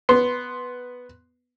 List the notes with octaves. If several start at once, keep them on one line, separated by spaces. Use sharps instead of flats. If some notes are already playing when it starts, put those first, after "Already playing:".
B3 C6